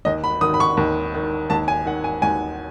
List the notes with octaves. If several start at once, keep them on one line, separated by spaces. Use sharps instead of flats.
D#2 D#5
B5
D#3 D#6
B5
C#6
D#2
D#3
D#2 A5
G#5
D#3 F#5
G#5
D#2 G#5